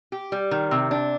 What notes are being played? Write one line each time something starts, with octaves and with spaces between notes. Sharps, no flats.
G4
G3
D#3
C3
D4